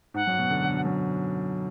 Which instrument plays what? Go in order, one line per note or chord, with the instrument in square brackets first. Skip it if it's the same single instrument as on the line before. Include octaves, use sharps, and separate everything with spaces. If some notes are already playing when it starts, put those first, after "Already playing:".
[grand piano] G#2 [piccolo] F#5
[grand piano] F#2
B2
D3
D3
B2
F#2